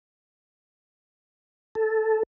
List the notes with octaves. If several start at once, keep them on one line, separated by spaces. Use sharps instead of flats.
A4